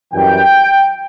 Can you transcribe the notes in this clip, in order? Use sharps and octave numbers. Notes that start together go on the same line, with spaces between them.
F#2 E3 G3 G5